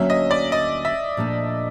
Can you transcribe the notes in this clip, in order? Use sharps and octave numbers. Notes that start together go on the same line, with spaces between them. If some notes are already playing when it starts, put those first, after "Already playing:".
Already playing: D2 D3 F#3 A#3 C#4 E5
D#5
D5
D#5
E5
A#2 F3 A3 D4